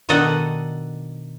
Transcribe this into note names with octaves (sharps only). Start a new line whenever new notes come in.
B2 D#3 D4 A4 D#5 F#5